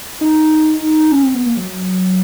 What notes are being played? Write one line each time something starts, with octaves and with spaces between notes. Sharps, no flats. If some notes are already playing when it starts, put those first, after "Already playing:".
D#4
C#4
C4
B3
A#3
F#3